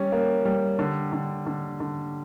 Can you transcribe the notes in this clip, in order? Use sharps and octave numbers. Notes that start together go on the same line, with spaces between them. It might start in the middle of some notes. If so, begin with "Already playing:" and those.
Already playing: G3 C#4
A#3
G3
D3
D3
D3
D3